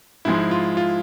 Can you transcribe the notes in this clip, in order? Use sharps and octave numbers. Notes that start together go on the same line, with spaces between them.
G#2 F3 G#3 E4
F4
F4